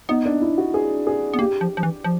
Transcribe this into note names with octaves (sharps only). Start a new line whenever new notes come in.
B3 D#4
D4
E4
F#4
G#4
G#4
B3
A#3 G4
F3
F3
E3
F3